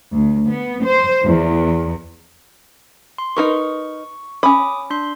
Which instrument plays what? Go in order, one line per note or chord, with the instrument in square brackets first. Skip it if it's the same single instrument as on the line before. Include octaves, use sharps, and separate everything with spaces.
[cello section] D2
B3
C5
E2
[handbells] C6
[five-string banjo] D#4 A#4 B4 [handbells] C#6
[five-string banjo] C#4 B5 [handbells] D6 D#6
[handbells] D4 C6